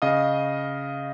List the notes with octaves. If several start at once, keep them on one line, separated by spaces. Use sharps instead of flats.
C#3 D#5 F5 D#6